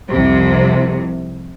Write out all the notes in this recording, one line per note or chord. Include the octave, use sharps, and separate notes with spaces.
C2 F2 C3